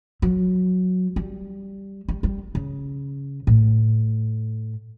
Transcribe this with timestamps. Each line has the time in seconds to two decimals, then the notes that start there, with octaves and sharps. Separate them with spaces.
0.22 F#3
1.16 G3
2.09 G3
2.23 G3
2.55 C#3
3.47 A2